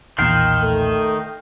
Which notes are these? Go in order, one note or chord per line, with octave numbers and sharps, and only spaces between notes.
B1 E2 A#2 D#3 F5 G5 C6
A3